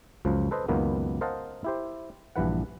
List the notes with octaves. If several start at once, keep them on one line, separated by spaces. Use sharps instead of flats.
C#2 F#2 F3
A4 B4 C5 D#5
C#2 F#2 D#3 A#3 B3
A#4 C5 D#5 F5 F#5 A5
E4 G4 C5
A#1 G2 E3 B4 F#5